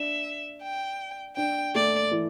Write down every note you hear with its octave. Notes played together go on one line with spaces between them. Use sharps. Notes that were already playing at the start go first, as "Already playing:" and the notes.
Already playing: D4 E5
G5
D4 G5
A3 D5
E3